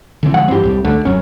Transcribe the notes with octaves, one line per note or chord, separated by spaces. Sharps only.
D3 E3 C4
D3 F3 G#3 F#5
G2 E3 C4 G4
C2 A2 G3
C#2 D3 A3
D#1 F#2 F#3 C#4